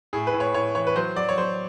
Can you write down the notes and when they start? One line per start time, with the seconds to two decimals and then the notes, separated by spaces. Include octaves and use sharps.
0.13 A2 G#4
0.27 B4
0.33 A2
0.40 C#5
0.54 A2 C#5
0.75 E3 C#5
0.87 B4
0.96 F#3 C5
1.16 F#3 D5
1.29 C#5
1.38 F#3 C5